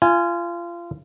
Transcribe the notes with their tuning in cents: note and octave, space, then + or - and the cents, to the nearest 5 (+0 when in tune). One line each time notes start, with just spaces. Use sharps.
F4 -25 G#5 +0